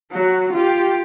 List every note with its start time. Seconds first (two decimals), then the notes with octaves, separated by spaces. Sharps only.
0.12 F#3 F#4
0.53 F4 G4